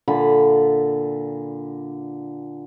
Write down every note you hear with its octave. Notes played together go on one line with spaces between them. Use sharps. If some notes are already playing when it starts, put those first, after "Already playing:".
A#2 D3 B5